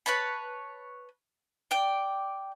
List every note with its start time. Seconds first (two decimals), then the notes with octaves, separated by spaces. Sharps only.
0.06 B4 C#5 A5 B5
1.71 D5 G5